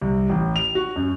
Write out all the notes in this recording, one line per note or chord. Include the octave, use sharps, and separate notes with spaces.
C2
A1
F7
F#4
F#2